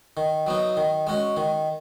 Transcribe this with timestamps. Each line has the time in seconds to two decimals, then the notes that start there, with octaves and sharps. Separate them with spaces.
0.17 D#3
0.47 F#3 B3 D#4
0.77 D#3
1.07 G#3 C#4 F#4
1.37 D#3